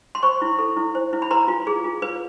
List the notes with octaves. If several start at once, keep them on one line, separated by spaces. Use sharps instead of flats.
C6
C5 B5 C#6
E4
A4
E4
C5
E4
B5
B4 A#5 C6
F4
G#4
F4
B4